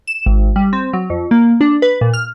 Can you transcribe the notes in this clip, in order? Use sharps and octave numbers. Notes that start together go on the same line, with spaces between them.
E7
G#1
G3
C4
F#3
F2
A#3
D4
B4
A#2
F6